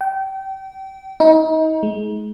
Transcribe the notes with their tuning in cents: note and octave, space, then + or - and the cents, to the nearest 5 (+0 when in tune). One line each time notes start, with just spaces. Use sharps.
G5 -30
D#4 +30
G#3 +30